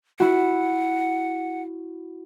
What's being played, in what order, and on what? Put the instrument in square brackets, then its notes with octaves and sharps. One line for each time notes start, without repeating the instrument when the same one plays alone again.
[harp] E4 F#4 [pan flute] F#5